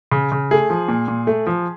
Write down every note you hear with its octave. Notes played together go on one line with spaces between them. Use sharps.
C#3
C#3
A3 G#4
F3
A#2
A#2
A3
F3